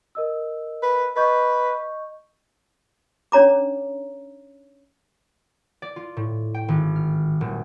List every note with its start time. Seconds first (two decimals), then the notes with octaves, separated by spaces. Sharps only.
0.15 A#4 D#5 E6
0.83 B4
1.16 B4 D#5 C#6 G6
3.32 C#4 D4 C#5 A#5 D6
5.82 D5
5.96 F4
6.17 A2
6.54 G5
6.68 G#1
6.96 F6
7.41 D#1